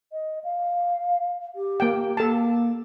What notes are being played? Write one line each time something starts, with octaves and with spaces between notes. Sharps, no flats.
D#5
F5
G4
A#3 G5
A#3 A4 A5